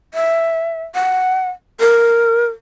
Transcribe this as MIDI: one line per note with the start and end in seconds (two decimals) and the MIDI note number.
0.14 0.83 76
0.95 1.49 78
1.80 2.48 70